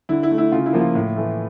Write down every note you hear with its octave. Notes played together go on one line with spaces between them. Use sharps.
D3 E4
E4
A3
E4
C#3 F4
E4
F3 A#3
F4
A2
E3 A3